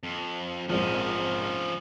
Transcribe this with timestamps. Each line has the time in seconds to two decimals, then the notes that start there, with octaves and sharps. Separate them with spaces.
0.03 F2
0.69 A#1 F2 G#2 F3 C#4